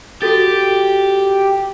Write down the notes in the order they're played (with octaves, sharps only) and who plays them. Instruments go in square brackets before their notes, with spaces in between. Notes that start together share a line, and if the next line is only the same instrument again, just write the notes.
[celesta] F#4 A4 A6 [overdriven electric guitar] G4